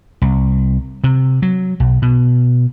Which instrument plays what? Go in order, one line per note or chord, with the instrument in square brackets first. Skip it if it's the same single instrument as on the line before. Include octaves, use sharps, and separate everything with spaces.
[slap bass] C2
C3
F#3
B1
B2